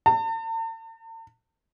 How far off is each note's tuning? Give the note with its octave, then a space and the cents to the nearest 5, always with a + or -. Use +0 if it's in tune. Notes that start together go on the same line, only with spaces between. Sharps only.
A5 +45